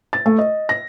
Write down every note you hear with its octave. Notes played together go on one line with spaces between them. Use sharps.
A6
A3
D#5
A#6